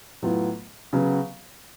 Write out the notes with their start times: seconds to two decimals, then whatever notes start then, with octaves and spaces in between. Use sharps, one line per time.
0.23 A2 F#3 B3 F4
0.93 C#3 F#3 B3